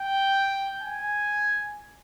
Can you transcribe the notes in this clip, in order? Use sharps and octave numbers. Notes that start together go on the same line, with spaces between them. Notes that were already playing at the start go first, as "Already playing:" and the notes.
Already playing: G5
G#5